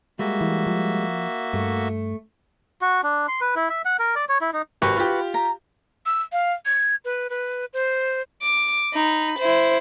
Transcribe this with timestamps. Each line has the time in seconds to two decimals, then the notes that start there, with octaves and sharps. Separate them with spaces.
0.19 G3 G#3 A#3 F#4 E5
0.41 E3
0.67 F3
1.54 G2 A3
2.82 F#4
3.03 D4
3.28 C6
3.41 B4
3.56 E4
3.70 E5
3.85 F#5
3.99 A#4
4.15 D5
4.29 C#5
4.41 E4
4.53 D#4
4.82 G#1 F#4 G4 B4 F#5
4.96 F4 G4
5.34 A#5
6.06 E6
6.32 F5
6.66 G#6
7.05 B4
7.30 B4
7.73 C5
8.42 D6
8.94 D#4 B5
9.39 E4 C5